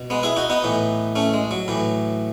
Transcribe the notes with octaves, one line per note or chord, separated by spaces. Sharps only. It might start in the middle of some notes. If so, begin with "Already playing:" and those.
Already playing: B2
G#3 B3
E4 G#4
D#4 F#4
B3 D#4
A2 E3
A3 C#4
G#3
F#3
A2 E3